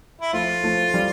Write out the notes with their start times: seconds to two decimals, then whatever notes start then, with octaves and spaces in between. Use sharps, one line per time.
0.21 E4
0.33 F3 A3 F4
0.63 F3 A3
0.94 G3